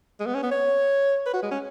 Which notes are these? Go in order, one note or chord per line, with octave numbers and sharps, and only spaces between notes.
G#3
B3
C#4
B3
C#5
B4
F#4
G#3
C#4